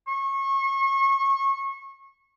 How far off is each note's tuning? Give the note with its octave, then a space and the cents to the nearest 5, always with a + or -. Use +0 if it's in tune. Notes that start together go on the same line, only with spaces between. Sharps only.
C#6 -30